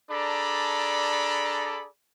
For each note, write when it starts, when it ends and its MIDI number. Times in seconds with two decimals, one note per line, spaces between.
0.10 1.87 62
0.10 1.87 68
0.10 1.87 69
0.10 1.87 74
0.10 1.87 82
0.10 1.87 83